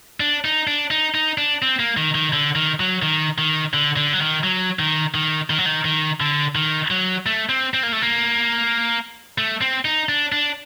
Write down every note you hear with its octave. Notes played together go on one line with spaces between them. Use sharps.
D4
D#4
D4
D#4
D#4
D4
C4
A#3
D#3
D#3
D3
D#3
F#3
D#3
D#3
D3
D3
F#3
D#3
F#3
D#3
D#3
D#3
F#3
D#3
D#3
D3
D#3
F#3
A3
C4
C4
A#3
A3
A#3
A3
C4
D#4
D4
D4